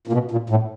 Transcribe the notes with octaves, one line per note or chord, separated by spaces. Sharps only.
A#2
B2
A#2
A2